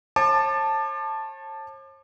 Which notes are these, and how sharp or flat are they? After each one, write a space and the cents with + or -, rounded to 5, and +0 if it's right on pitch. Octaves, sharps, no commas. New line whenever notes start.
C#5 -45 A5 +0 D6 +35